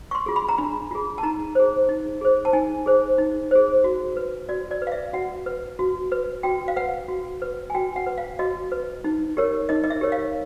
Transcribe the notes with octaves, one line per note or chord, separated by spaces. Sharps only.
C#6
C6
F4 G#4
B5
A#5
D4 B5
F4 G#4
A5
D#4 A#5
G#4 C5
D#4
G#4 C5
A5
D#4 G#5
G#4 C5
D#4
G#4 C5
F#4
B4
F#4 D5
D5
B4
F5
E5
F#4 F#5
B4
F#4
B4
F#4 G5
F5
B4 F#5
F#4
B4
G#5
F#4 G5
F#5
B4
F5
F#4 D#5
B4
D#4
G4 A#4 C#5
D#4 D#5
D#5
E5
G4 A#4 C#5
F5